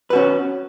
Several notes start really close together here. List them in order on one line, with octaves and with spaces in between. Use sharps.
B4 F#4 C#4